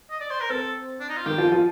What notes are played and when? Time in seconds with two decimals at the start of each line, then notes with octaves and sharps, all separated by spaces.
0.10 D#5
0.20 D5
0.30 C5
0.41 A#4
0.49 C4 A4
1.00 D4
1.09 D#4
1.17 F4
1.26 D#3 G4
1.38 F3
1.52 F3